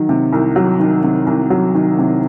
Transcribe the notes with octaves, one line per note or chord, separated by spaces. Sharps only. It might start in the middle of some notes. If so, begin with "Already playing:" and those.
Already playing: D#3 F#3
C3
C2
F#3
D#3
C3
C2
F#3
D#3
C3